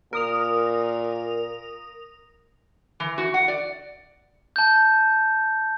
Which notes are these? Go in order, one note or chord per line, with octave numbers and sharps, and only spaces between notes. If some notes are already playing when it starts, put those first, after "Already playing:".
A#2 A#4 D#6 F7
E3
F#4
F#5
D5
A5 G6